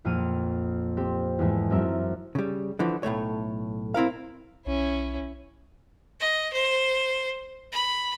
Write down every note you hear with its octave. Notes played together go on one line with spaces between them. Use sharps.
A#1 F2 A#3 F6 D#7
C4 G4
E2 G#2 G#3 A3
F#2 C4 A#4 E5
C#3 G3
D3 E3 F3
B1 A2 A3 C#5
C4 E4 A#4 F5
B1 C#4 E4
D#5
C5
B5